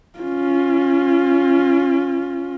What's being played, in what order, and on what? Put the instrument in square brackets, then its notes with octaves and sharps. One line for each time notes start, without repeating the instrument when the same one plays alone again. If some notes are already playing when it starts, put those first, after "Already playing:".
[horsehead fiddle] C#4 F4